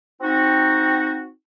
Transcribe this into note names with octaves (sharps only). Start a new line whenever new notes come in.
C4 D#4 F#4